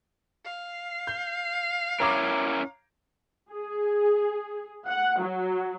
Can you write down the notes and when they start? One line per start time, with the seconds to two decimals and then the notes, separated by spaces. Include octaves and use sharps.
0.45 F5
1.07 G6
2.00 C#4 E4 A#4 C#5 A#5 D6
3.49 G#4
4.87 F#5
5.19 F#3